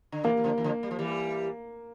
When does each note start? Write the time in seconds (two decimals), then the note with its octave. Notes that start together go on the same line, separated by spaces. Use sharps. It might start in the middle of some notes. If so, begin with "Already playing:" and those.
0.12 D3
0.24 C3 E3 A#3
0.37 E3
0.44 D3 F3
0.58 E3
0.64 D3 F3
0.83 G3
0.91 F3
0.99 E3 G3